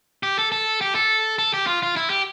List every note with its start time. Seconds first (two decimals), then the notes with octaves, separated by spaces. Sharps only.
0.23 G4
0.39 A4
0.52 A4
0.81 G4
0.95 A4
1.39 A4
1.54 G4
1.67 F4
1.83 F4
1.96 E4
2.10 G4